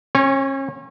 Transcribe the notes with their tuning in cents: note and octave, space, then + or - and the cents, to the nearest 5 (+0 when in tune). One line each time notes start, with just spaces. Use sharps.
C#4 -35 C#5 +0